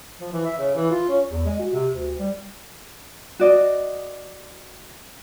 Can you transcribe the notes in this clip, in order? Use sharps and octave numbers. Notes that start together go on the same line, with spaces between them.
F3
E3
E5
C#3
E3
F4
C#4
E2
G#3
F#4
C3
D2
G3
F#4 D5 D#5